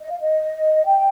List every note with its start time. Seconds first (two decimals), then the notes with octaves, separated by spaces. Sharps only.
0.01 D#5
0.11 F5
0.20 D#5
0.86 G5